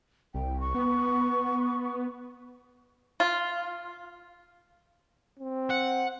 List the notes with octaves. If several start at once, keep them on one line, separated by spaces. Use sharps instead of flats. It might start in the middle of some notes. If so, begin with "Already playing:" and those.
C2 G5
C#6
B3
F4
C4
F#5